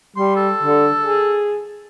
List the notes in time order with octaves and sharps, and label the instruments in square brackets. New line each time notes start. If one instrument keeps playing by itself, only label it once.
[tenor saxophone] G3 [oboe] C6
[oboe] A4
[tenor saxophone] D3
G#4